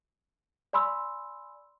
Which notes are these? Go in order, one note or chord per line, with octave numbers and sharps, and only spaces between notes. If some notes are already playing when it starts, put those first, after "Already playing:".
D5 G#5 B5 C6 E6